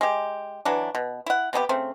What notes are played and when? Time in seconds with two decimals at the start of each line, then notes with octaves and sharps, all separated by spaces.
0.01 G#3 G4
0.65 E3 F#3 D4
0.95 B2
1.26 E4 F#5
1.53 C3 B3 D#4 G4
1.69 C#3 A3 C4